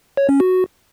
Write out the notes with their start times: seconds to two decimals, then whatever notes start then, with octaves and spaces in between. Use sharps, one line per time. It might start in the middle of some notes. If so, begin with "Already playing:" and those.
0.17 C#5
0.29 C#4
0.40 F#4